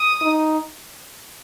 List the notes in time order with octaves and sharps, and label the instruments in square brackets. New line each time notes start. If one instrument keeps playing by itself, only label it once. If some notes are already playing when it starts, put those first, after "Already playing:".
Already playing: [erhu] D#6
[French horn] D#4